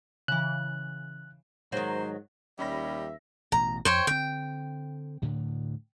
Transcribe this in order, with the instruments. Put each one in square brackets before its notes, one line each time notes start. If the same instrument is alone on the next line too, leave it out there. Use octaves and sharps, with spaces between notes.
[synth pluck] C#3 E3 [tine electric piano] F#6
[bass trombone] G#2 [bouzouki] D#3 F#3 [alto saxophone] C5
[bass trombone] D#2 [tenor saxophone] G3 [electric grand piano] C#4 B5 A#6 [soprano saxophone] E5
[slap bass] A1 B2 [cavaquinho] A#5
[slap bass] F2 [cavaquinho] C5 C#5 G5
[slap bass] D3 C4 [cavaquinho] G5
[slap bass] D2 A2 D3